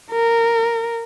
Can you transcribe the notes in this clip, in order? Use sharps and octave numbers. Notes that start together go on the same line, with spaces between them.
A#4